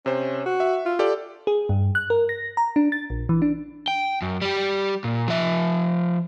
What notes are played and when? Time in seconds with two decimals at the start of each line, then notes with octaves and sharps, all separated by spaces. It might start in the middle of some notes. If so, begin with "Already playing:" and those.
0.06 C3 C#4 C5
0.46 F#4
0.60 E5
0.86 F4
0.99 G4 A4 D5
1.47 G#4
1.69 G2
1.95 F#6
2.10 A#4
2.29 A#6
2.57 A#5
2.76 D4
2.92 A6
3.10 A#1
3.29 E3
3.42 D4
3.88 G5
4.22 F#2
4.42 G3 G4
5.04 A#2
5.28 F3 E5